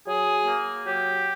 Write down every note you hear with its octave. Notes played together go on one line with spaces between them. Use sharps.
F#3 G#4
A#3
F#3 G4